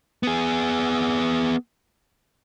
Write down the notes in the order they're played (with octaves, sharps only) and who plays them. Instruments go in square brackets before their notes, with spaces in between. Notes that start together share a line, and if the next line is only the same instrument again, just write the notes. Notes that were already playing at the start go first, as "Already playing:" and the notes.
[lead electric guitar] B3 G#4